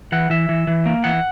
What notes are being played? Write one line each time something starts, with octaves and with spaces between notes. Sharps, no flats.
E3 F#5
E3 E5
E3
E3
A#3
E3 F#5